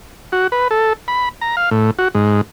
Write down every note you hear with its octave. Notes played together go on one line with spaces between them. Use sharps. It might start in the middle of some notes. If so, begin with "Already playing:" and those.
F#4
B4
A4
B5
A#5
F5
A2
F#4
G#2